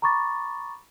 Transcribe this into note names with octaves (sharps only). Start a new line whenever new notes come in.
A#5 B5 C#6 D6 A6